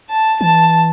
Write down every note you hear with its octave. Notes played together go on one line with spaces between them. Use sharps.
A5
E3 A5